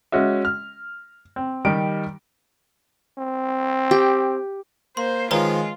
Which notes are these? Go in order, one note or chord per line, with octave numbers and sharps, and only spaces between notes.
G#3 C#4 F#4 E5
F6
C4
D#3 G3 D#4 G4 D7
C4
G4
A#3 C5 C6
D#3 F3 G#3 F4 B4 C#5 A#5